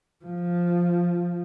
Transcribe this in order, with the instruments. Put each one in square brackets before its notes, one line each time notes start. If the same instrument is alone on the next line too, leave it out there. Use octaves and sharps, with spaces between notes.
[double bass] F3